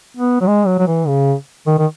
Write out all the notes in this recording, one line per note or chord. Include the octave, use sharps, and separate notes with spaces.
B3
F#3
G#3
F#3
F#3
E3
C#3
D#3
D#3